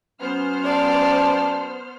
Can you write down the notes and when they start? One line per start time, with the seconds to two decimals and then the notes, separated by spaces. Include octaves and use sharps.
0.21 F#3 B3 C#4 C5 F6
0.65 D5 A5